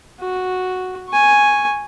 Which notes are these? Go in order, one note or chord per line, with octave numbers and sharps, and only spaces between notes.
F#4
G#5 C#6